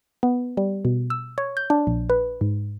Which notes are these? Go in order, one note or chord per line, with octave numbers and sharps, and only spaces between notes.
B3
G3
B2
E6
C#5
G6
D4
A#1
B4
G#2